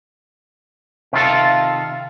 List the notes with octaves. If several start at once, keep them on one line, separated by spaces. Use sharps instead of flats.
C3 D#3 F4 A4